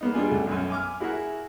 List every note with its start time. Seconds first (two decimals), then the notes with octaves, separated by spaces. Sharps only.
0.01 A#3 B3 D#4
0.14 G3 D4 F4 G#4
0.29 C#2 A3
0.47 B1 F#2
0.70 G#5 D6 F6
1.00 E4 F#4 G#4 A#4 E5 F#5